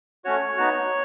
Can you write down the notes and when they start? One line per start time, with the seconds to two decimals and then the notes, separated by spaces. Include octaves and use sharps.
0.25 A3 C#4 F#4 C#5
0.57 B3 D#4 F#4